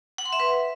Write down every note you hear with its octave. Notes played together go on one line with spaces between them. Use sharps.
F#5
C6
E5
B4